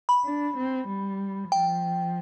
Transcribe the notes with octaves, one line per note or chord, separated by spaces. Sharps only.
B5
D4
C4
G3
F3 G5